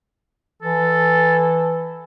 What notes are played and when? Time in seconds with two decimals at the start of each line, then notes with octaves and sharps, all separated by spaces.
0.62 E3 A4